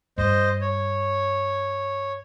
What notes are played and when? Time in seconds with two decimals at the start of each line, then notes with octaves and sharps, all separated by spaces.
0.18 G2 C5 D#5
0.61 C#5